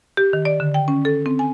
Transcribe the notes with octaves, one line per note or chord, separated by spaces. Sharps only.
G4
D#3
D5
D3
G5
C#4
A4
C4
G#5